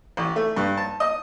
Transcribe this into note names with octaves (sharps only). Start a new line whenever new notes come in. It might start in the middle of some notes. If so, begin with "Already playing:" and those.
A1
A3
G2
A5
D#5